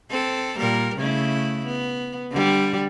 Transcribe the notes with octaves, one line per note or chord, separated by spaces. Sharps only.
C4 A4
A#2 G3 A#4
C#3 A3 E4
B3
D3 G3